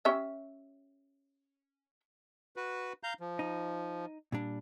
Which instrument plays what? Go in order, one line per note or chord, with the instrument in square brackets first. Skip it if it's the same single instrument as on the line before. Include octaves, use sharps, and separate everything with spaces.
[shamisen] C#4 G4 E5
[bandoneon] F#4 B4
F5 A#5 G6
F3
[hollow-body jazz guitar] D#4
A#2 G3 D4